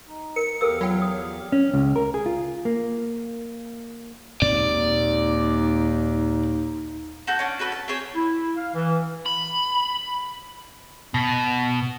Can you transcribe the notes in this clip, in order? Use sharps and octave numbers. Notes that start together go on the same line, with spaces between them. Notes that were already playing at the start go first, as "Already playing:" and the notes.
D#4
A#4 C#7
E2 G4 A4 A#4 F5 E6
F#3 F4 G5
D#6
C#4
C#2
A#4
G#4
F4
A#3
D#2 A#2 G#3 C4 D#4 D5
F#4 A4 G6
C#4 D4
F#4 A4 B4 A5
A5
C4 G#4 C5 C#5
E4
F5
E3
B5
B2